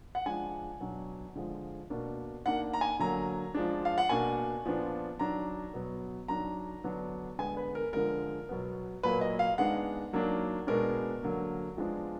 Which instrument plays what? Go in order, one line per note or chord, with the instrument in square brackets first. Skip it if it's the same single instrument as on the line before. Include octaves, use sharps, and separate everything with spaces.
[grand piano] F#5
F3 G#3 D4 G#5
B2 F#3 D4
D3 F3 G#3
B2 A#3 D4
D#3 A#3 D4 F#5
A#5
G#5
D3 F#3 A#3 A#5
F3 G#3 D4
F5
F#5
B2 A#3 D4 G#5
A#2 F3 B3 D4
D#3 F#3 D4 A#5
B2 F#3 B3
D#3 F#3 D4 A#5
D3 F#3 B3 D4
D3 G#3 B3 G#5
B4
A#4
D3 F3 G#3 A#4
B2 F#3 B3
A#2 F#3 A#3 B4
D#5
F5
D#3 G#3 B3 D4 F#5
D#3 F#3 A#3 D4
B2 G#3 B3 D4 A#4
D3 F#3 A#3
F3 G#3 B3 D4